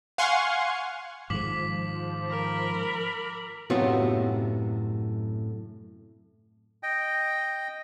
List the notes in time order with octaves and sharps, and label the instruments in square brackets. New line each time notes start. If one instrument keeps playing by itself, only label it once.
[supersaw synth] F5 F#5 G#5 C6 C#6
[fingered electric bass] G#2 D#3 G#3 [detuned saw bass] F3 [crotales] D6 B6 F#7
[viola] A#4 B5
[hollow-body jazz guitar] F#2 A2 C3 B3 F4 F#4
[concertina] D#5 G5